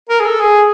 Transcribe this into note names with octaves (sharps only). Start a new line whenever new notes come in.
A#4
G#4
A4
G#4